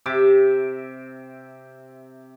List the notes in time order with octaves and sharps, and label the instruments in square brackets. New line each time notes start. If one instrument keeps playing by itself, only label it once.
[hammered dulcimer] C3 G4 E5 D6